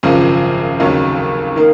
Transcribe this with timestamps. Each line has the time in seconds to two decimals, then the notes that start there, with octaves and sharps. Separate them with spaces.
0.03 G#1 F#2 C#3 F3
0.80 F1 D#2 C#3 F#3
1.56 D#3 A#3